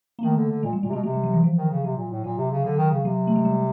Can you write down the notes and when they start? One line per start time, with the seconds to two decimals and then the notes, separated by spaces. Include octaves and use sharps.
0.19 A#3
0.23 D#3 A3
0.36 D3
0.49 D3
0.63 A#2 G#3
0.73 G3
0.83 A#2 G#3
0.89 C3
0.93 B2 G#3
1.03 C3 G#3
1.13 G3
1.23 F#3
1.33 E3
1.44 F3
1.57 D#3
1.71 C#3
1.84 C3 F#3
1.97 A#2
2.11 A2
2.24 A#2 F#3
2.38 C3
2.51 C#3
2.65 D3 F#3
2.77 D#3
2.91 C#3
3.05 C3 F#3
3.27 A3
3.36 G#3
3.45 G3